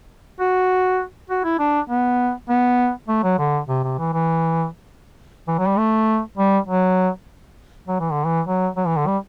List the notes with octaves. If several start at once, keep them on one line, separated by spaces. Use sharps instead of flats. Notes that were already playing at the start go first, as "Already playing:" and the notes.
F#4
F#4
E4
D4
B3
B3
A3
F#3
D3
C3
C3
E3
E3
E3
F#3
G3
A3
G3
F#3
F#3
E3
D3
E3
F#3
F#3
E3
D3
G3